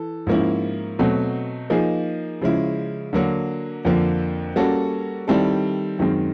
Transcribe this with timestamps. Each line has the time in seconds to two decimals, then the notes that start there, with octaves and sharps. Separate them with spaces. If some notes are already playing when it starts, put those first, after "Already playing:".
Already playing: E3 A4
0.27 G#2 F3 A#3 C#4 E4
0.99 B2 F#3 A3 C4
1.70 F3 A#3 D#4 G#4
2.41 C#3 F3 G#3 C#4 E4
3.13 D3 F#3 A#3
3.85 F2 D3 F3 A#3
4.56 G3 A#3 C#4 F#4 A4
5.28 D#3 G3 C4 E4 A4
5.99 F#2 D#3 G#3 C4